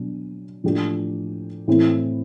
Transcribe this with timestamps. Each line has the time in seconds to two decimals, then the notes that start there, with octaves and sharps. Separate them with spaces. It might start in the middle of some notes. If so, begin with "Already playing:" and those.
Already playing: B2 F#3 D4
0.63 A2 F3 A3 D4 G4
1.68 A2 E3 A3 C4 E4